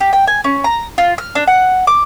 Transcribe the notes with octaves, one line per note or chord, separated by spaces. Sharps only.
G4
G5
G#5
C#4
A#5
F4
F6
D4
F#5
D6